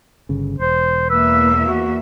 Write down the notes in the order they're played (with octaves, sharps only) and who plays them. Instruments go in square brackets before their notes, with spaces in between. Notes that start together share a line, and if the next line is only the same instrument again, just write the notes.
[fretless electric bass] G1 C#3
[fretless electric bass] E1 [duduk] C5
[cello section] E2 A#3 E5 [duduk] B4 [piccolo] E6
[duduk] F#4